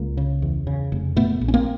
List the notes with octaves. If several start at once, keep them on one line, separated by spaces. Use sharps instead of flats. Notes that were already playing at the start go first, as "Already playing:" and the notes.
Already playing: C#2 G#3 A#3
C#3
E2
C#3
F1
A#2 A3 B3
A#1
C#4
A#3 C4